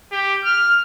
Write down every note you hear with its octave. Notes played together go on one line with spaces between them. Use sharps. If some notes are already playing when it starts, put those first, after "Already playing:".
G4
F6